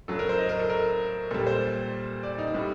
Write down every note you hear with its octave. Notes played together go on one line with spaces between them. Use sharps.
A2 F#3 A4
A#4
C5
D#5
A#4
A4
A#4
A#2 G3 A4
C5
D5
D#4
A2 G3